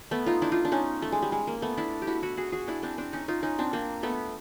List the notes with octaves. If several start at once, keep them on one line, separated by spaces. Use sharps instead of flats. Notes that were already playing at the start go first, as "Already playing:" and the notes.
A3 B3
D#4 F4
D4 E4
D#4 F4
D4
C#4 D#4
A3
G#3
G3
G#3
A#3
A3 B3
D4 E4
G4
E4 F#4
E4 F#4
F#4 G#4
F#4 G#4
D4 E4
C4 D4
C4 D4
C#4 D#4
D#4 F4
C#4 D#4
C4 D4
A#3 C4
A3 B3